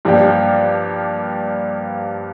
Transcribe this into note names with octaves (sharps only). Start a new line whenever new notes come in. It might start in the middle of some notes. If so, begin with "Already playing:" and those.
G2 F3 A#3 D4 G4